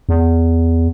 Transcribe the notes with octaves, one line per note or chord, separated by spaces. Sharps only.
E2